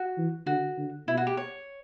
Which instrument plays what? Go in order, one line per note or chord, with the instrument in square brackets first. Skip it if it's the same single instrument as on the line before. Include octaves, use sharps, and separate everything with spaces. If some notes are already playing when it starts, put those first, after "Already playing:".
Already playing: [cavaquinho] F#4
[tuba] E3
[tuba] D3 [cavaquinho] F#4
[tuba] D3
[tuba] B2 [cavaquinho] E4
[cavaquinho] F#4
G4
C#5